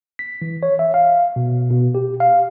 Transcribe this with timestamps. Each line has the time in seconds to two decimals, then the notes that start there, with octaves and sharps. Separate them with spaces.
0.19 B6
0.42 E3
0.63 C#5
0.79 E5
0.94 F5
1.36 B2
1.70 B2
1.95 G4
2.20 F5